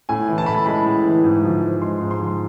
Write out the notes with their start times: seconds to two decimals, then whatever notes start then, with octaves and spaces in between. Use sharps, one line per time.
0.09 A2 G#5
0.28 E3
0.38 A5
0.46 A2 B5
0.55 A5
0.66 G#3 B5
0.86 A2
1.05 E3
1.24 G#2
1.44 F3
1.62 G#2
1.82 G#3 C6
2.01 G#2
2.11 C6
2.20 F3